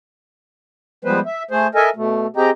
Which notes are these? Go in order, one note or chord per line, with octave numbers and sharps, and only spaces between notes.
F3 G3 G#3 B3 B4 C5
E5
A3 G#4 C5
A4 A#4 D#5 E5 G#5
B2 A3
C4 G4 G#4 D#5 G5 A#5